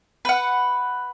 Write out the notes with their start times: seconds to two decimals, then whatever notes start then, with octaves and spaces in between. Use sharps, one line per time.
0.25 B4 F#5